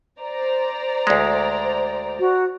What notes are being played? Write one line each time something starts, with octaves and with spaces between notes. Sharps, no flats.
C5 D5 A#5
D2 G#3
F#4